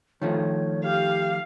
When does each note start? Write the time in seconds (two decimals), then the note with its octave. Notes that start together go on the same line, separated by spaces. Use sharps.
0.22 D#3 F3 A3 C#5
0.84 G4 F5